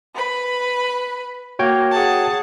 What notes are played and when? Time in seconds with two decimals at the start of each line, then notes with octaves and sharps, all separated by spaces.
0.15 B4 B5
1.59 A#3 F#4 C#5 G5
1.91 G#4 F#5 A5